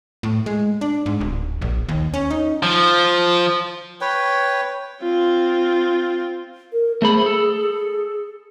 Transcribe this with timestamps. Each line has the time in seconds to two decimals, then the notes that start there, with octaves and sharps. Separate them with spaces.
0.23 A2
0.46 G#3
0.81 D4
1.06 G#2
1.21 D1
1.62 A#1
1.89 D#2
2.14 C#4
2.31 D#4
2.63 F3
4.01 B4 C#5 G5
5.03 C4 F4
6.72 A#4
7.02 A3 G#4 C5 B5
7.26 A4